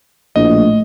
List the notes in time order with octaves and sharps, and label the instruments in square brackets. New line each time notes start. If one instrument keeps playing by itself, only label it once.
[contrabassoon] A#1 [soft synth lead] A2 [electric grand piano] D#5